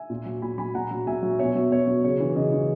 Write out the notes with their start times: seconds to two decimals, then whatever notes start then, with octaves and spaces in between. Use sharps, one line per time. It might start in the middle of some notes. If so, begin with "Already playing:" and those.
Already playing: E5 G#5
0.10 A#2
0.26 F#3
0.42 A#2 G#5 B5
0.58 F#3 G#5 B5
0.75 A#2 F#5 A#5
0.91 F#3
1.07 A#2 E5 G#5
1.23 F#3
1.39 B2 C#5 E5
1.55 F#3
1.71 B2 C#5
1.87 F#3
2.04 C#3 C#5
2.20 E3
2.36 C#3 D#5
2.52 E3